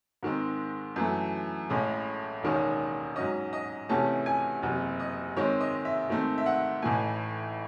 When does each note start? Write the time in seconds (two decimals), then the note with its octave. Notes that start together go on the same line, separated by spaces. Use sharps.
0.23 G#2 D#3 G#3 C4
0.96 F#2 E3 A3
1.70 A1 A2 G#3 C#4
2.43 E1 D#2 D#3 G#3 C#4
3.16 G#2 F#3 C#4 D#5
3.53 D#5
3.89 E2 C3 E3 A3 C#4 A5
4.26 G#5
4.63 F#1 E2 C3
5.00 D#5
5.36 G#2 D#3 G#3 C4 C#5
5.61 D#5
5.85 E5
6.09 G#2 D#3 A3 C4
6.38 E5
6.46 F#5
6.82 A1 A2 E3 A3 G#5